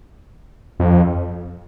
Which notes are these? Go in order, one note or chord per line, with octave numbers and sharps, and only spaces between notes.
F2